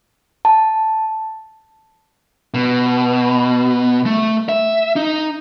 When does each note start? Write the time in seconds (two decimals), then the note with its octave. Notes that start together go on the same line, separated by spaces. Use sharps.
0.45 A5
2.54 B2
4.06 A3
4.49 E5
4.96 D#4